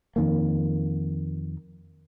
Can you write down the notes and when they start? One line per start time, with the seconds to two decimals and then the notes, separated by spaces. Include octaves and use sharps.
0.16 F2 D#3 A#3